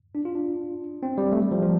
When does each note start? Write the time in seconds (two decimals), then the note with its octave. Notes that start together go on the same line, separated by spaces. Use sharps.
0.15 D4
0.25 F4
0.35 D4
1.03 C4
1.18 G3
1.32 A3
1.42 G3
1.51 F3
1.62 F3